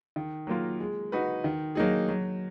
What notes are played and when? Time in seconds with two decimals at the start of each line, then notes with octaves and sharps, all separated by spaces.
0.16 D#3
0.47 F#3 A#3 F4 A#4
0.80 G#3
1.12 D#4 F#4 B4
1.44 D#3
1.75 F#3 A#3 D#4 G#4
2.09 F#3